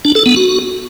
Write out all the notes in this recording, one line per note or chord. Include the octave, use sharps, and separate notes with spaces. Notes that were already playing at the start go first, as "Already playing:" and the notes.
D4
A4
B3
F#4